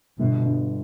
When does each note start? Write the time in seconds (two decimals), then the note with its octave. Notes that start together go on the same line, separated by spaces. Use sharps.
0.19 G1 B2
0.46 G2